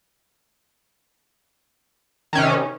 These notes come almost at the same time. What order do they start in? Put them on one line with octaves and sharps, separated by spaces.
D#3 C#4 C3